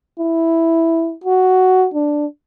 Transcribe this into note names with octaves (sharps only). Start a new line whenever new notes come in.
E4
F#4
D4